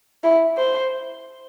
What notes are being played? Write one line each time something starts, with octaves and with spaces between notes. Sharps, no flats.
E4
C5